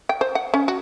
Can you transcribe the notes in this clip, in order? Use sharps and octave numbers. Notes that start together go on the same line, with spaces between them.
G5
C5
F#5
C#4
F#4